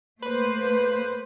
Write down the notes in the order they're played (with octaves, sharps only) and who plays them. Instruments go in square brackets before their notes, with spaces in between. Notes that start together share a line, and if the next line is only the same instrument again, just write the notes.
[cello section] A3 A#3 C5 [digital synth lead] B4